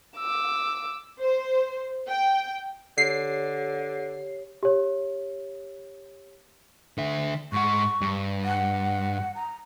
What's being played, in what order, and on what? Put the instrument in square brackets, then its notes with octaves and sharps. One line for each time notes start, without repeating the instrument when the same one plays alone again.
[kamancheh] D6 E6
[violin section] C5
G5
[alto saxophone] D3 [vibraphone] G4 C#5 [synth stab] C7
[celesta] G4 C#5
[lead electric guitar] D3 E5
[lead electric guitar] G#2 F#5 [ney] C#6
[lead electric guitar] G2
[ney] F#5
A#5